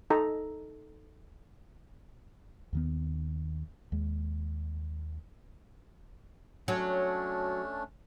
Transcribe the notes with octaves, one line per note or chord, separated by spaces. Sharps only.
D#4 A4 A#5
D#2 D#3 B3
D#2 G#3
F#3 A3 C#4 D4